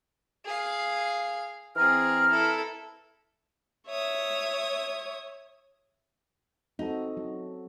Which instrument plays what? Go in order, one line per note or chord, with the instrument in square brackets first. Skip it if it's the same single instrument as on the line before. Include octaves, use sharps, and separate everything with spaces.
[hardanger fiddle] G#4 F5
[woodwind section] E3 A#5 F6 [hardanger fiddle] C4 G#4
[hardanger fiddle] E4 A4
[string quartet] C#5 E5 D#6
[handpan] C4 F#4 A4 [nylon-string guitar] D#4
[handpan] F#3